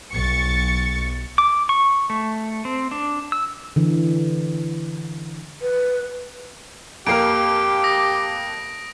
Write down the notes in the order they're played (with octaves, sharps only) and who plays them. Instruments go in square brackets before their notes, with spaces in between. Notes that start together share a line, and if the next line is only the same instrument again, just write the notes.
[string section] B1 C#6 A6 C#7
[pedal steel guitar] D6
C#6
A3
C4
D4
E6
[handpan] D3 E3
[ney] B4
[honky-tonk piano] F2 A#3 A#4 [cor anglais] G4 [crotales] D7
[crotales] D#6 A#6